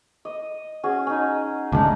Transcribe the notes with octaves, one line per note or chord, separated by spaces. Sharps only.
D#5
C#4 F#4 G#4
C#4 D#4
D2 C#3 G#3 D4 D#4 A#5